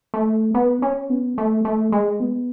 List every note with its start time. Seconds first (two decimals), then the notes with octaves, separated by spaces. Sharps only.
0.14 A3
0.54 B3
0.82 C#4
1.10 B3
1.38 A3
1.65 A3
1.92 G#3
2.20 B3